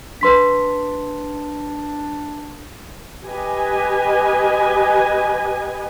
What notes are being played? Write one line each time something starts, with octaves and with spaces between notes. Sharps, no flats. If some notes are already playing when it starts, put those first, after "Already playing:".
D4 B4 C6 B6
G4 B4 D#5 G#5